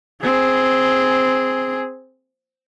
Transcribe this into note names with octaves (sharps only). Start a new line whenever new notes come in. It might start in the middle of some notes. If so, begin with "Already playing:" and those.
C4 G#4